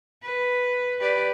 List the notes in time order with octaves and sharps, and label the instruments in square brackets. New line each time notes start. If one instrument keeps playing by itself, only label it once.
[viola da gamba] B4
G4 B4 D5